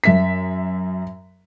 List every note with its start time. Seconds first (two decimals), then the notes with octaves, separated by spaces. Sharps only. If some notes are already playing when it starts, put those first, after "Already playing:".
0.04 F#2 E5 B6